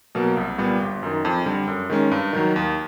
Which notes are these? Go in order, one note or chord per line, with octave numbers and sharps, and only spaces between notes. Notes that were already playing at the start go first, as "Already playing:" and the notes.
B2 F#3 A#3
C2
A#2 G3 B3
G1
F#2 D#3
F2
D3 G3
F#2
D#3 G#3 C#4
G2
D#3 F#3
D#2